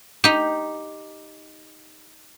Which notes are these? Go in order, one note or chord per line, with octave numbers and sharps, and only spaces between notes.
D#4 G4